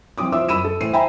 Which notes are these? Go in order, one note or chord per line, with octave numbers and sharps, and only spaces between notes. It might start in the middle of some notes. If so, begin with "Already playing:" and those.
E3 F3 C4 F4 D6 D#6
F4 C5 E5 D6 E6
F#2 B5 E6 D#7 E7
A4
A2 E3 C5 C7 D#7
C5 E5 G5 G#5 A#5 B5